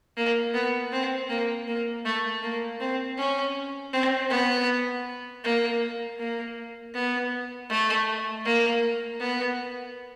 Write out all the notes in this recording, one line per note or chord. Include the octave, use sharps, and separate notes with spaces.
A#3
B3
C4
A#3
A#3
A3
A#3
C4
C#4
C4
B3
A#3
A#3
B3
A3
A#3
B3